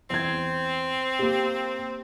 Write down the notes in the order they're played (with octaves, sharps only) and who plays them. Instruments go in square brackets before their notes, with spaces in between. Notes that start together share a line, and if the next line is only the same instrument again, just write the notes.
[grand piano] E2 G#6 [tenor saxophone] C4
[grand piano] A#3 G4